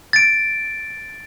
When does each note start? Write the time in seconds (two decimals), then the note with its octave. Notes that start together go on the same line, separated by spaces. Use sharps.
0.13 A6 D7